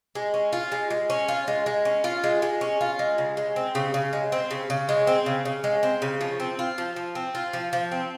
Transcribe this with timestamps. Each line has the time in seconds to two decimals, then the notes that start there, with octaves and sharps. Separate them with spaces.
0.15 G#3
0.34 C#4
0.53 F4
0.72 G#3
0.90 G#3
1.10 C#4
1.28 F4
1.48 G#3
1.66 G#3
1.85 C#4
2.04 F4
2.24 G#3
2.42 G#3
2.61 C#4
2.81 F4
2.99 G#3
3.18 C#3
3.37 G#3
3.56 C4
3.75 C#3
3.94 C#3
4.13 G#3
4.32 C4
4.51 C#3
4.70 C#3
4.89 G#3
5.07 C4
5.26 C#3
5.45 C#3
5.64 G#3
5.83 C4
6.02 C#3
6.21 F3
6.40 C4
6.59 F4
6.78 F3
6.96 F3
7.15 C4
7.35 F4
7.53 F3
7.73 F3
7.92 C4